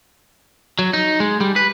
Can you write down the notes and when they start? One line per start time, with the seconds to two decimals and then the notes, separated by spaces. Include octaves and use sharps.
0.79 F#3
0.93 D#4
1.20 G#3
1.41 G3
1.56 B4